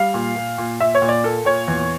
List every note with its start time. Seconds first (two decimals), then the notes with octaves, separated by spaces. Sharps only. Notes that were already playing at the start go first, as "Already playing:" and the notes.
Already playing: G3 F5
0.14 A#2
0.36 A#2
0.58 A#2
0.80 A#2 E5
0.95 C#5
1.02 A#2
1.09 D5
1.24 A#3 A4
1.45 A#2 C#5
1.68 E2